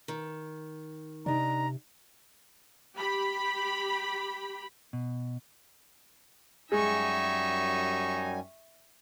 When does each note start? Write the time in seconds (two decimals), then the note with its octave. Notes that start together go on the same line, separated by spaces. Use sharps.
0.08 D#3
1.26 C3 D4 D#4 A#5
2.94 G4 B5
4.93 B2
6.72 F#2 G3 G#3 D#4 E5 G#5 C#6